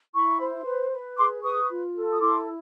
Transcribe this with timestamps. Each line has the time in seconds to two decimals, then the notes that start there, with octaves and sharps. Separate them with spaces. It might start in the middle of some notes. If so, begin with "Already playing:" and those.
0.14 E4 B5 C#6
0.40 C5
0.66 B4
0.92 B4
1.17 G#4 C6 D6
1.43 B4 C#6 D#6
1.70 F4
1.95 A4
2.12 D#6
2.21 E4 C6 D6